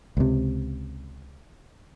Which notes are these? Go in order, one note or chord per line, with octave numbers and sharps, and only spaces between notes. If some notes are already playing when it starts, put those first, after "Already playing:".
C#2 C3